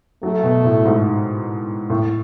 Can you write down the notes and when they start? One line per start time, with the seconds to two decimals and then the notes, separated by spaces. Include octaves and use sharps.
0.23 F#3 A3
0.43 B2
0.64 A2
0.85 G#2
1.90 A2